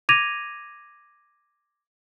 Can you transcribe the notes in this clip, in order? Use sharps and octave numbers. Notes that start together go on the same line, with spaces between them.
D6 G#6 A#6 D#7 F7